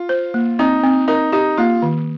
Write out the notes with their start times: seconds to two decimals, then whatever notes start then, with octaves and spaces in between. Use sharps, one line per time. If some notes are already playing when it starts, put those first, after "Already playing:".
Already playing: F4
0.09 C5
0.34 A#3
0.59 C4 D#4
0.84 C4
1.08 D#4 A#4
1.32 D#4 G4
1.57 A#3 F4
1.82 D#3